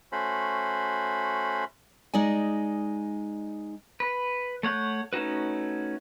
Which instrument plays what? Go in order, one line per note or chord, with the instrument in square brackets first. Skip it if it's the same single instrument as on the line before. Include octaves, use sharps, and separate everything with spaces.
[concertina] A3 C#4 F#4 C5 B5
[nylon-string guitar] G#3 D#4 D5 G#5
[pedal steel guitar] B4
A3 C#5 F#5 G6
A3 C#4 D#4 F#4 B4